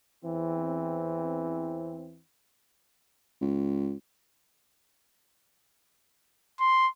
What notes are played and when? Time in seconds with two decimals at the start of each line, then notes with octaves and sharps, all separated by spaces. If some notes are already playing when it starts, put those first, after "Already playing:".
0.24 E2 E3 C4
3.41 C#2
6.60 C6